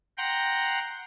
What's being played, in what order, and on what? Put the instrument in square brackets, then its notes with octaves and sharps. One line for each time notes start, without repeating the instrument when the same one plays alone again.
[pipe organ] F#5 G5 A#5 C6